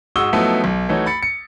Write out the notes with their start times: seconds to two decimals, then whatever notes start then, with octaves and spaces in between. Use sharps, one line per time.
0.16 G#2 F#4 C#6 D#6 E6 G7
0.33 F3 F#3 A3 B3 D#4 E4
0.64 B1
0.89 E3 A3 D#4 F#4 C#5
1.06 B5 A6 C#7
1.23 C#7